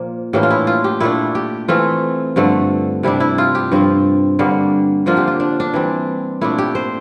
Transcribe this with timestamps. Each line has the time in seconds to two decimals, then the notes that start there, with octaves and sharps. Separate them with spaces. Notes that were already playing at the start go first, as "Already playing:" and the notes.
Already playing: A#2 F3 A#3
0.33 A2 E3 A#3 D4 G4
0.43 F4
0.50 E4
0.67 F4
0.84 G4
1.00 A#2 A3 D4 E4
1.35 G4
1.68 E3 A3 C4 F4
2.36 G2 D3 F3 A3
3.03 C3 G3 D4 E4
3.20 E4
3.38 F4
3.55 G4
3.72 G2 F3 C4
4.39 G2 D3 G3 A#3
5.06 D3 F3 A#3 D4 F4
5.17 G4
5.27 F4
5.40 D4
5.60 D4
5.74 E3 G3 C4
6.41 A#2 A3 D4 E4
6.58 G4
6.75 C5